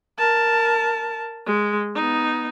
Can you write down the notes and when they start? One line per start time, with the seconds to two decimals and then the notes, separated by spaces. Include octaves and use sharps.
0.18 A#4 A5
1.46 G#3
1.95 B3 D#4